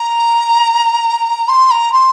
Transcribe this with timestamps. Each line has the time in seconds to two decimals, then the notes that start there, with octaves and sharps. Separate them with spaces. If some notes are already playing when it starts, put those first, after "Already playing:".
Already playing: A#5
1.48 C6
1.71 A#5
1.92 C6